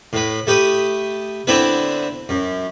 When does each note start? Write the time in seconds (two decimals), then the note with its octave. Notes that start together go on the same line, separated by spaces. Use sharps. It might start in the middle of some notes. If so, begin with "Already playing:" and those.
0.13 A2 B4
0.47 A3 G4 B4 D#6
1.47 D3 B3 C4 D4 E4 B4
2.29 F#2